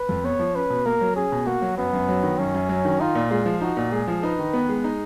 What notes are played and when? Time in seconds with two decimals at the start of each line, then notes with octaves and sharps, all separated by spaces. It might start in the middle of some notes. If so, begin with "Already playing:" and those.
Already playing: B4
0.09 F2
0.24 B3 C#5
0.39 F3
0.55 C#4 B4
0.70 B2
0.86 A#3 A#4
1.01 F#3
1.16 C#4 G#4
1.32 B2
1.47 A#3 F#4
1.62 F#3
1.77 F#2 B3
1.93 F#2
2.08 F#3
2.23 D#3
2.38 F#2 C#4
2.54 F#2
2.69 F#3
2.85 D#3
3.01 D#4 F4
3.15 A#2
3.31 G#3 F4
3.46 F3
3.61 D#4 F#4
3.77 A#2
3.92 G#3 G#4
4.08 F3
4.23 D#4 B4
4.39 D#3
4.53 B3
4.69 G#3
4.84 D#4